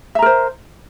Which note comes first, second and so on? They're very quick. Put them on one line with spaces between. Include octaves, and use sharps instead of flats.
E5 A#5 A#4 C5